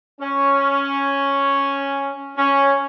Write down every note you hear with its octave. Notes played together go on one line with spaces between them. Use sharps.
C#4
C#4